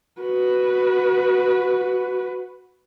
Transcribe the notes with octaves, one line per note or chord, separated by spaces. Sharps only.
F#4 B4